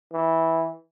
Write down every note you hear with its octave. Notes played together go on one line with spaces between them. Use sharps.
E3